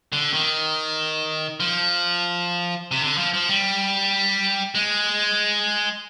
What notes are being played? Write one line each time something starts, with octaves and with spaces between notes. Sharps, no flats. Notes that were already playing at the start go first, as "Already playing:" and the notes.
D3
D#3
F3
C3
D3
F3
F3
G3
G#3